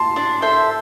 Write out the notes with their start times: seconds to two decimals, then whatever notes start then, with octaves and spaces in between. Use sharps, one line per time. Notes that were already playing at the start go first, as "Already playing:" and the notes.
Already playing: A5 C6
0.16 D4
0.42 A4 C5 E5